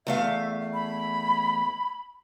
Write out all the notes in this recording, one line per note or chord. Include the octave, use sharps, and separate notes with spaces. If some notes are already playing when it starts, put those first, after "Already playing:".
E2 A3 E5 F5
B5